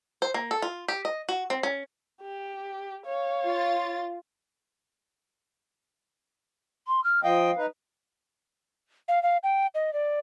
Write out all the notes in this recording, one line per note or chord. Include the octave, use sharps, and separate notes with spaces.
C5
A#3
A4
F4
G4
D#5
F#4
C4
C#4
G4
C#5 F5
F4 A6
C6
F6
F3 D#5 F5 G5
D#4 B4
F5
F5
G5
D#5
D5